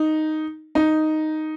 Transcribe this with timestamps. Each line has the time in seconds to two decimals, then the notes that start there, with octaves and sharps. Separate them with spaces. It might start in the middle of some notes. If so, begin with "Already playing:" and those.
Already playing: D#4
0.75 D#4